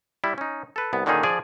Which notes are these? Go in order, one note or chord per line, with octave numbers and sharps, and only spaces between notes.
G3 E4
C#4 D#4
A4 B4
C2 B3
A#2 D3 D#3 C#4 D#4 G#4
F3 G#4 D5